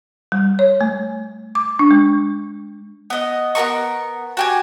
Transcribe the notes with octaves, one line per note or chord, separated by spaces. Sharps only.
G3
C#5
A3
D6
D4
G#3
B3 D#5
B3 F#4 A#4 C#6
F#4 G4 G#5